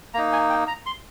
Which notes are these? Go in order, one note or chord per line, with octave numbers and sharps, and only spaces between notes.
A#3 D#4 A#5
G#5
G5
A#5
C6